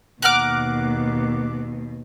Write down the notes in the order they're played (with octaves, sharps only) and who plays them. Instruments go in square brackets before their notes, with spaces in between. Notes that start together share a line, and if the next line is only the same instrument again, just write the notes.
[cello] D#2 B2 [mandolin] A#4 F#5 F6 [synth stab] D6 F#6